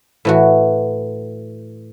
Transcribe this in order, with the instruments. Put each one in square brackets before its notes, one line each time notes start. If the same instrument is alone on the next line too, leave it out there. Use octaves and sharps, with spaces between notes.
[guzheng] A2 E3 F#4